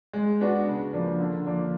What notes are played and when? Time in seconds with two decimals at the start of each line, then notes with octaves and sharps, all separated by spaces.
0.13 G#3
0.41 B3 D4 F#4
0.67 C#3
0.93 F3 A#3 D4
1.20 D3
1.45 F3 A#3 D4